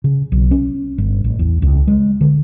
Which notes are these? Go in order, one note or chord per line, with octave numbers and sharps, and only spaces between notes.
C#3
B1
C#4
G1
A1
E2
C#2
G#3
D3